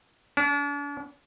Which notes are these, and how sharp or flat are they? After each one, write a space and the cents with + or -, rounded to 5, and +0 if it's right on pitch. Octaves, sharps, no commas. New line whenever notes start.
D4 -45